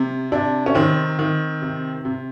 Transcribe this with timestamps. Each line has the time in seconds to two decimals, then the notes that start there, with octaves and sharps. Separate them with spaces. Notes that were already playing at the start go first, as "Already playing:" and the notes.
Already playing: C3
0.32 C3 D4
0.66 C#4
0.75 D#3 C4
1.19 D#3
1.62 C3
2.05 C3